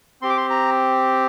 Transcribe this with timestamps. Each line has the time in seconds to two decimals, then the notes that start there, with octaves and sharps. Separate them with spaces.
0.22 C4 G4 C6
0.30 D6
0.37 C6
0.50 A#5